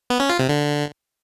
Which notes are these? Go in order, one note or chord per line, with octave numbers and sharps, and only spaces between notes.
B3
C#4
F4
C3
D3